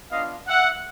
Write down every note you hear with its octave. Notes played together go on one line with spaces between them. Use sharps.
B3 D4 F4 D#5 F5
E5 F#5